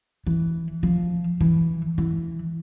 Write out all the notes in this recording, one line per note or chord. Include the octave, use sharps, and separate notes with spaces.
E3
F3
E3
E3